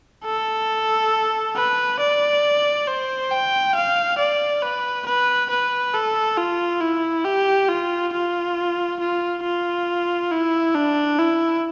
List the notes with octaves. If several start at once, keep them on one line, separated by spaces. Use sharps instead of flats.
A4
B4
D5
C5
G5
F5
D5
B4
B4
B4
A4
F4
E4
G4
F4
F4
F4
F4
E4
D4
E4